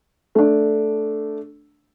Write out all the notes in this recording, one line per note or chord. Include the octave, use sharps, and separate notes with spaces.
A3 D4